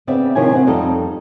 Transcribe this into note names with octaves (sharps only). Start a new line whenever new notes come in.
C#3 B3 C4 D5 E5
C3 D#3 F3 E4 C#5 G#5
C4 F#5
F2 G3 D#4 A4